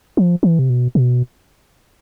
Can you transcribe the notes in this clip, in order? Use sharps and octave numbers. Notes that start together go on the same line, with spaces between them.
F3
E3
C3
B2
B2